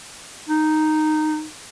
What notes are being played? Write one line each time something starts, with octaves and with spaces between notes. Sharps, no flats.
D#4